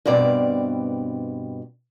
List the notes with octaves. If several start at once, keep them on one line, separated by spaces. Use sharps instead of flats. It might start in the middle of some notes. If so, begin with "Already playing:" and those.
G2 B2 C4 D5